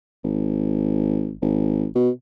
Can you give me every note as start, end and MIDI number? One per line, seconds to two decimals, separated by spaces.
0.24 1.35 32
1.42 1.86 32
1.95 2.10 47